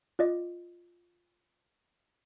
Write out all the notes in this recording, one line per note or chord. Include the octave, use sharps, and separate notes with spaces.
F4 D5 D#5